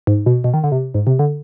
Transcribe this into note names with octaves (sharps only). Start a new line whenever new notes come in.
G#2
B2
B2
D#3
D3
C3
G#2
C3
D3